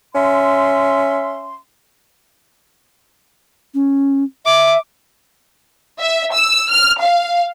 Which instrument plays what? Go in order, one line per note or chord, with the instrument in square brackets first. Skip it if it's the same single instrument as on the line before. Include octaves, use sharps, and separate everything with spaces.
[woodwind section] C#4 E5 C6
[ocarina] C#4
[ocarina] E5 [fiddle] D6
[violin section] E5
E6
F6
F5